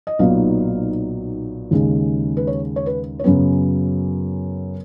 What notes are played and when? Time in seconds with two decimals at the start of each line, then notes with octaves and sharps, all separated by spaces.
0.07 D#5
0.19 B1 A#2 F#3 B3 D#4 F5
1.71 D#2 C#3 G#3
2.37 B4
2.47 C#5
2.76 C#5
2.86 B4
3.19 C#5
3.24 F#2 C#3 F#3 B3 B4